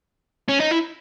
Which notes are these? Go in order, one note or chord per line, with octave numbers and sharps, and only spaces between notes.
C#4
D#4
E4